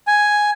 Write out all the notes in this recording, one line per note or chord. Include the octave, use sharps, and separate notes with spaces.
G#5